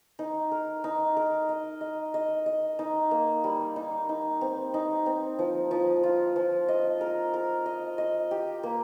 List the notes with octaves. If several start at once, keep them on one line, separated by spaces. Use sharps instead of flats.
D#4
A#4
D#4
A#4
D#5
D#5
D#5
D#5
D#4
A#3
G3
D#4
D#4
C4
D#4
C4
F3
F3
F4
F3
D#5
A#4
A#4
D#5
D#5
G4
A#3